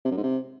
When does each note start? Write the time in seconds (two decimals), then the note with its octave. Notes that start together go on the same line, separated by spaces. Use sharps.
0.05 C3
0.11 F#2
0.17 G#2
0.23 C3